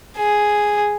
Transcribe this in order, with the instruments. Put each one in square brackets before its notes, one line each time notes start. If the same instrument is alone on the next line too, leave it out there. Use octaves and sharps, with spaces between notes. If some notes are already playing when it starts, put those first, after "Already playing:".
[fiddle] G#4